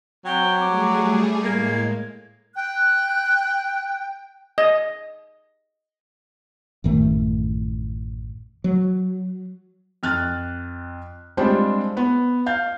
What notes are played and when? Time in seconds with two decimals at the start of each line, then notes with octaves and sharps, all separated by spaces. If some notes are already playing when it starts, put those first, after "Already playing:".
0.25 F#3 C4 G5
0.60 G3 A3 G#4 D6
1.44 A2 G#3 A#3 G#6
2.55 G5 F#6
4.58 D#5
6.84 A1 F#2 D#3 A3
8.64 F#3
10.03 F2 F6 F#6 A6
11.37 G3 G#3 C4 D4 F4 C5
11.97 B3
12.46 F5 G6